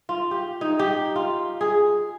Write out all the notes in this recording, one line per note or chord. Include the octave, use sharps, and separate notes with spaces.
F4
G4
D#4
G4
F4
G#4